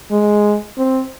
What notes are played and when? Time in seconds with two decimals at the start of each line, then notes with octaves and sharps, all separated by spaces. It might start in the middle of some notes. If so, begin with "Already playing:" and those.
0.12 G#3
0.78 C4